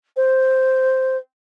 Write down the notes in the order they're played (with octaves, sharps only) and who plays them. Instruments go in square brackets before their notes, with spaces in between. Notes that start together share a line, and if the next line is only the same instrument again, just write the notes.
[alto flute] C5